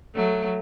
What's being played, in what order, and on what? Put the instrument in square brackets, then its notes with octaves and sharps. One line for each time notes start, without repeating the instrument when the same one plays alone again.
[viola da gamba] F#3 A3